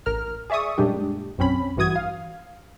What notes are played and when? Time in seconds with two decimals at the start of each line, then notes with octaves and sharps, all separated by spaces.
0.06 A1 A#4 F6
0.50 G#4 D5 E5 C#6 D#6
0.78 F#2 A#2 G3 G#3 D4 G4
1.38 B1 F#2 C4 C#4 B5
1.76 A1 G2 E3 F#4 D#6 G#6
1.96 F5